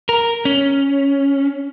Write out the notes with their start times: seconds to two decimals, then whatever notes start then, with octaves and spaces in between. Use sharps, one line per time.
0.09 A#4
0.45 C#4